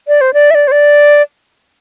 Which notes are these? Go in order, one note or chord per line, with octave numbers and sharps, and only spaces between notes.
D5
C5
D5
E5
D5
C5
D5